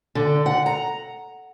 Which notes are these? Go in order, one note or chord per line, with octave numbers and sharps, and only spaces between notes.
D3
F#5
A#5